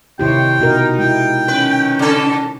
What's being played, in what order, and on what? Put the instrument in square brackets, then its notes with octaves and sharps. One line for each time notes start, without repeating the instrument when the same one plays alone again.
[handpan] C3 E4 G4 [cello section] D#3 C5 C#5 [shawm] G5
[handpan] B2 F#4 A#4 [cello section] D#4
[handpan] G#3 E4 [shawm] G5
[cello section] D#3 C#4 [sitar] B4
[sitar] C#3 A4